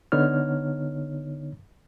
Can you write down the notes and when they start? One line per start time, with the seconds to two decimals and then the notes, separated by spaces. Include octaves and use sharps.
0.12 D3 B3 D#4 C#5 F6